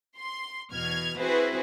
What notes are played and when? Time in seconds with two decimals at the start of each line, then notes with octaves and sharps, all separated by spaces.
0.19 C6
0.72 E2 B2 F6 G#6
1.18 C4 E4 F#4 G#4 B4 C5